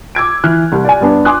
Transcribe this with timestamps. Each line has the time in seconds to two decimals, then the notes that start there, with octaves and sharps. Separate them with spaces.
0.15 D6 E6 G#6 D7
0.44 E3 F6 F#6
0.72 C2
0.84 D5 G#5
1.01 G2 B3 D4
1.25 G#5 C6 D6 D#6 F#6